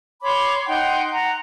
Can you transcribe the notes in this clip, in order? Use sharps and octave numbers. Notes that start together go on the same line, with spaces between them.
C#5 B5 C6 D6
D#4 F#5 G5 C6
F#5 A#5